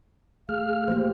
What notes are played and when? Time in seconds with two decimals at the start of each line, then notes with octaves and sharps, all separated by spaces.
0.49 A3 G#4 F5 F6
0.88 F3 A#3 G4 C5